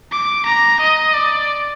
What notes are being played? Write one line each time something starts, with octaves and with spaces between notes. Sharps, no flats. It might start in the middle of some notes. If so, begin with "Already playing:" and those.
D6
A#5
D#5
D5